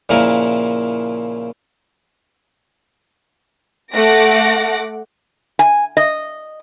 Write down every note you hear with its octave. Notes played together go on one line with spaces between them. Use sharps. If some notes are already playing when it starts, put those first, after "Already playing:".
A#2 C#3 F3 E4 A#4
A3 F#5 D6 A#6
G#5
D#5